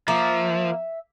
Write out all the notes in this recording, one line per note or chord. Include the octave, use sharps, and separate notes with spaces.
F3 A#3 E5